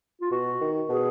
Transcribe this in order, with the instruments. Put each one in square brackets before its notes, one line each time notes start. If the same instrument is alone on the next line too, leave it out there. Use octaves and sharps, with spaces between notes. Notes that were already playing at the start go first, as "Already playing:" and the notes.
[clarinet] F4
[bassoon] B2 [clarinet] F#4
[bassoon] D#3
[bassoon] B2 [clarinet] G#4